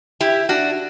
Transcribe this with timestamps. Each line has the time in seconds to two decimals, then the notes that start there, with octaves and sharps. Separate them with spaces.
0.20 E4 G4
0.49 D4 F#4